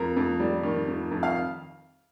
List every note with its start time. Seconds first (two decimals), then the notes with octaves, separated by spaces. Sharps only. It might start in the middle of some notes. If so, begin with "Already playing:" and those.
Already playing: F2 A#4
0.16 F2
0.40 G3
0.63 D#3
0.88 F2
1.11 F2
1.23 F5